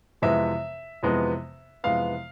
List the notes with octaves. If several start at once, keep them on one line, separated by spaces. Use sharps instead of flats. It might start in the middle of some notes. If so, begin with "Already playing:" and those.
F2 C3 E3 G#3 B3 E5
F2 C3 E3 G#3 B3
F2 C3 E3 G#3 B3 F5